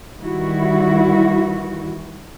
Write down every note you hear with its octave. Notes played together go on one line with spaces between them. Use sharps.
D#3 E3 G3 E4 F#4